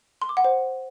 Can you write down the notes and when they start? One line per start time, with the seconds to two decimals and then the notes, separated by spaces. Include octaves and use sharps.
0.22 C6
0.29 D6
0.37 F#5
0.45 C5